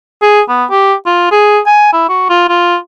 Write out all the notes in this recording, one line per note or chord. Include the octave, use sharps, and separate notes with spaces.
G#4
B3
G4
F4
G#4
G#5
E4
F#4
F4
F4